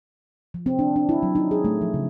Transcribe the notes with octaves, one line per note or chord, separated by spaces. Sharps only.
F3
C4
D4
D4
E4
F#3
D#4
G#4
A3
F3
C#3